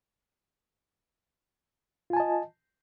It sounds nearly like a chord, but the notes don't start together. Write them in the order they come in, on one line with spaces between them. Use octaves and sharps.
F4 G#5 A5 D#5